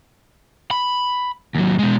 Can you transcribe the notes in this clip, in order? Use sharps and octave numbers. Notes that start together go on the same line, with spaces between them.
B5
D#2 F#3
B2 G#3